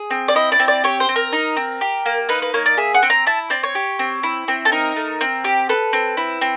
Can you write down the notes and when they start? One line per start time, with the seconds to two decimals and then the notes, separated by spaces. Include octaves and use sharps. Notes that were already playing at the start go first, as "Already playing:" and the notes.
Already playing: G#4
0.11 C4
0.28 D5
0.35 E4 D#5
0.52 D5
0.60 C4
0.68 D5
0.84 G4 C#5
1.00 C5
1.09 C4
1.16 A#4
1.33 D#4
1.57 C4
1.81 G4
2.06 A#3
2.29 D#4 B4
2.42 B4
2.54 A#3 C#5
2.66 D5
2.77 G#4 E5
2.94 F#5
3.03 C4
3.10 A#5
3.27 E4 A5
3.50 C4 D5
3.63 C#5
3.75 G4
3.99 C4
4.23 E4
4.48 C4
4.65 A4
4.72 D#4 A#4
4.96 A3
5.21 C4
5.45 G4
5.69 A4 B4
5.93 C4
6.17 E4
6.41 C4